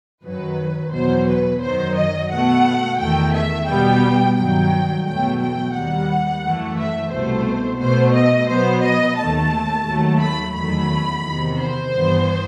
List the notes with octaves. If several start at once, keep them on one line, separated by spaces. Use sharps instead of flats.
F#2 D#3 F#3 B4
E2 B2 F#3 C5
B4
F#2 D#3 F#3 C5
D#5
B2 A3 F#5
E2 D#3 A3 G5
E5
B2 G3 B3 G5
G2 D#3 F#3 G5
E2 B2 F#3 A3 G5
G5
D#2 D#3 G3 F#5
F#2 E3 A3
E5
C2 B2 A3 C5
B2 A3 C5
D#5
B2 F#3 B3 C5
D#5
D#2 D#3 A3 A5
D#2 D#3 F#3 A3
B5
E2 D#3 F#3 A3 B5
E2 C3 D#3
C5
G2 E3 B3